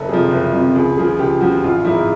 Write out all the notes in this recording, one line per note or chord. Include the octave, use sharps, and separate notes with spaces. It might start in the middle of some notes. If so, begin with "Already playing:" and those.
Already playing: F#1 A4
F2 C3 F3 G#4
F#1
F2 C3 F3
C#2 G#4
C#3 F3 G#4
C#2 G4
C#3 F3 F#4
A1 F4
G#2 F3 G#3 E4